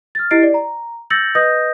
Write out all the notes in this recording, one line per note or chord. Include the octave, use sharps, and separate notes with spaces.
F6 A6
E4 G4 D#5 A6 C7 D7
D5
A#5
E6 G6 A6 A#6 C#7 F#7
B4 D#5 D#6 G6 A#6